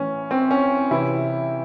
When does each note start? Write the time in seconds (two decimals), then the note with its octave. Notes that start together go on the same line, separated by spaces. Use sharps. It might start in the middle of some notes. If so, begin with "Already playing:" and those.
Already playing: A2 E3 C#4
0.31 C4
0.51 C#4
0.91 C3 E3 E4